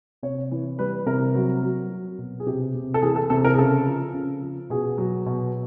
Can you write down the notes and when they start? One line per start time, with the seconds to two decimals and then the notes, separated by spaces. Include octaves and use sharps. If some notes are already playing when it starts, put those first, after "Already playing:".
0.23 C3 C#5
0.51 E3
0.79 G3 B4
1.06 C3 A#4
1.35 F#3
1.63 F#3
1.90 F#3
2.19 B2
2.40 G#4
2.46 C3 G4
2.75 C3
2.94 A4
3.02 E3 G#4
3.16 A4
3.30 C3 A4
3.45 A#4
3.54 G#4
3.58 C#3 A4
3.86 F3
4.14 C#3
4.42 F3
4.70 B2 G#4
4.98 F#3
5.26 B2